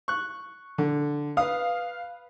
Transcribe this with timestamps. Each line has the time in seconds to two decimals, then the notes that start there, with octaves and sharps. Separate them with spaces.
0.08 C#6 F#6
0.78 D3
1.37 B4 F5 D#6